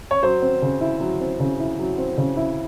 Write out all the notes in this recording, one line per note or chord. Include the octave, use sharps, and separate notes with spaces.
C#5
F#3 C5
C4
C#3
E4
F#3
C4
C#3
E4
F#3
C4
C#3
E4